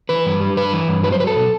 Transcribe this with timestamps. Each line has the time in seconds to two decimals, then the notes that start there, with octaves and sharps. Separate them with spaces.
0.09 E3 B4
0.26 G2
0.41 G3
0.57 G2 B4
0.73 E3
0.88 G2
1.03 F#3 B4
1.12 C5
1.19 F#3 B4
1.27 A4
1.36 B2